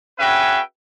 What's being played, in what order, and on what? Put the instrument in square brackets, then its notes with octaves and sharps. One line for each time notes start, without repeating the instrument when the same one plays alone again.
[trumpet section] C#4 F#4 G#4 B4 E5 G5